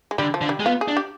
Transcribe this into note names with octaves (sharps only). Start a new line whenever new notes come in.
G#3
D3 G3
F3
D3
G3
G#3
B3 F4
G#4
D4
G4